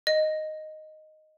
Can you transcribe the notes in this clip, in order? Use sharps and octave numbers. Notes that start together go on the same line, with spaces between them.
D#5